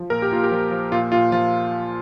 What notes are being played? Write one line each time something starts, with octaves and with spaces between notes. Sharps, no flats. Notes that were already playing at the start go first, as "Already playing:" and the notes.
Already playing: F3
A#2 A#4
G4
A#2 F4
G4
F3
F3
A#2 F4
A#2 F4
F3 F4